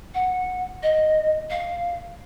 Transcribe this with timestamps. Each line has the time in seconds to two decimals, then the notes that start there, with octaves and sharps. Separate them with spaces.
0.14 F#5
0.82 D#5
1.50 F5